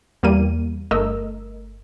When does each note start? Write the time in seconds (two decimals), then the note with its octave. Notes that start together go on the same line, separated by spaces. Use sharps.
0.23 E2 G3 A#3 D#7
0.91 G1 A3 A#4 D#5 E6